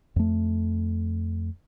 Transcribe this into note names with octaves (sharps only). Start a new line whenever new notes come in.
F2 A3